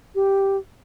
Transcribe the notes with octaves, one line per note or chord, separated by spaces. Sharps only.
G4